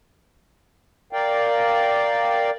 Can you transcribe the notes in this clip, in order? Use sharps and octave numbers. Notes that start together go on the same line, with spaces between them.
A#4 D5 F5 G5